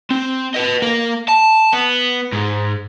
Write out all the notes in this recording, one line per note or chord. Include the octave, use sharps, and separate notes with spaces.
C4
B4 D#5
A#3 A#4
A5
B3
G#2